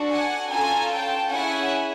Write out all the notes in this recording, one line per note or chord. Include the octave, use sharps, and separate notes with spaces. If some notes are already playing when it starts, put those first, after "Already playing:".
Already playing: D4 F#4 A4
F#5 G#5
C#4 F4 A4 G#5 A#5
G5 A5
C#4 E4 G#4 F#5 G#5